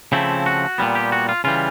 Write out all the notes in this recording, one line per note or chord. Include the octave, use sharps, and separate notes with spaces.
C#3 F3 A3 C4 E4
F#4
A#2 G3 B3
G4
F#4
F4
C#3 E3 G3 F4